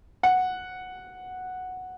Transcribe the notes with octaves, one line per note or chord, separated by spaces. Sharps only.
F#5